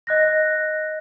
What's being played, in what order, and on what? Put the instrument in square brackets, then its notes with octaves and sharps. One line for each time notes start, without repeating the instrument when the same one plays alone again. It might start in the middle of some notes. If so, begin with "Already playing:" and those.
[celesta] D#5 F#6 A#6